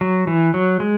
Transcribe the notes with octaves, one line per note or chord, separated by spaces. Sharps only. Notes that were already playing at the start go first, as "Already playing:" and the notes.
F#3
E3
F#3
G#3